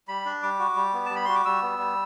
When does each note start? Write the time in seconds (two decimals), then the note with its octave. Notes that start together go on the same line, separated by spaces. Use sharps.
0.08 G3 B5
0.26 D4
0.43 G3 D6
0.59 F#4
0.76 G3
0.93 B3
1.06 G3 A5
1.16 B5
1.25 F#4 C6
1.35 D6
1.45 G3 E6
1.62 B3
1.79 G3